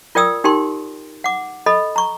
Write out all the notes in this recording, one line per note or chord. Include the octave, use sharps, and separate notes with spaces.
F4 A#4 D5 G5 D#6 E6
D#4 G4 A#4 G5 C6
F#5 D6
A4 D#5 B5
A#5 C#6